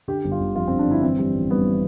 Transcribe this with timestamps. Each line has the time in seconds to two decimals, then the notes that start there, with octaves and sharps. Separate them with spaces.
0.08 D3 G4
0.25 G1
0.32 F4
0.40 G1
0.55 F2 F4
0.68 C4
0.71 D3
0.79 D4
0.86 G1 E4
1.02 E3 C4
1.18 G3
1.35 A1
1.51 G2 B3
1.66 E3